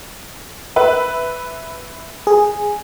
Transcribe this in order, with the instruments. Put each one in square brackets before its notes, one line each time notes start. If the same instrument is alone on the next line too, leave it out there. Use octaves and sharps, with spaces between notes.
[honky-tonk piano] B4 E5
[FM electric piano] G#4